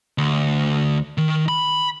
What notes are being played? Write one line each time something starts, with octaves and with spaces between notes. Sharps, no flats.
D2
D#3
B5